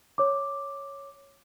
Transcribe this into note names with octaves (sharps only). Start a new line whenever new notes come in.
C#5 D6